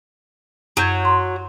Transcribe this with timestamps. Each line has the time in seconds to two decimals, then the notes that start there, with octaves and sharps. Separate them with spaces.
0.77 F#2 F#3 G6 G#6
1.05 A#5 C6